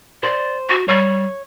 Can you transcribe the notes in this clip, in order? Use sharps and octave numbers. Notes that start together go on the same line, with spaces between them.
C5 D5
F#4
G3 C#5